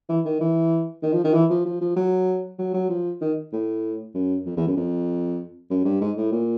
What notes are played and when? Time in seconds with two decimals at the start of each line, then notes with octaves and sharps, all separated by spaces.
0.09 E3
0.25 D#3
0.40 E3
1.03 D#3
1.13 F3
1.24 D#3
1.34 E3
1.50 F3
1.65 F3
1.81 F3
1.96 F#3
2.59 F#3
2.74 F#3
2.90 F3
3.21 D#3
3.53 A2
4.14 F#2
4.46 F2
4.56 E2
4.67 F#2
4.76 F2
5.70 F#2
5.85 G2
6.01 G#2
6.17 A2
6.32 A#2